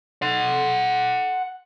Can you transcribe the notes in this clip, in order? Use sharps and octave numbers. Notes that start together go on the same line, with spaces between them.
F#5 C6